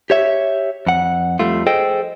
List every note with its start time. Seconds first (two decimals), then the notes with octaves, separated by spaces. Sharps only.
0.10 G4 C#5 E5
0.87 F2 F#5
1.39 F2 G3 A3 F4
1.67 G#4 A4 C5 D#5 G5